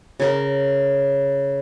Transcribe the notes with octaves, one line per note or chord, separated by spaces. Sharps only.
C#3 A#4